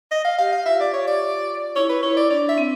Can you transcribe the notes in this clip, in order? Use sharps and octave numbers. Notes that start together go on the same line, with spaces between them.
D#5
F5
G4 F5
F5
F4 E5
D5
C#5
D5
E4 C#5
B4
E4 C#5
D5
D4 D5
E5
C4